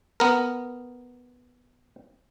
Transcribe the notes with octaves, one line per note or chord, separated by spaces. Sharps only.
B3 A#4